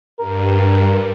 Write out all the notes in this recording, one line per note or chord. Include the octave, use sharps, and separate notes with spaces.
G2 A#4